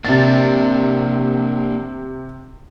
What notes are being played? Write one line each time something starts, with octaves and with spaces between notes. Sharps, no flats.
C3 A#3 D4 A6